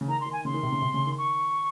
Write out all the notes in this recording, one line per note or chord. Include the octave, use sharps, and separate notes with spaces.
C#3
D#3 A#5
C6
D#3
G#5
C#3 C6
D#3
C3
C#3
C3
C#3
D#3
C#6